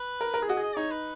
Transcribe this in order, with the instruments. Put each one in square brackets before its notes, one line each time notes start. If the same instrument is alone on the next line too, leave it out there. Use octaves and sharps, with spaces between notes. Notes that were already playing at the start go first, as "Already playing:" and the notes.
Already playing: [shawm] B4
[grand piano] A#4
A#4
G#4
[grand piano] F#4 [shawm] D#5
[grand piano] G#4
[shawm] D#5
[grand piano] D#4 [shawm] C#5
[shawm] B4